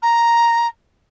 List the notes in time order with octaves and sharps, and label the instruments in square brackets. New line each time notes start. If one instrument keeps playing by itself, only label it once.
[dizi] A#5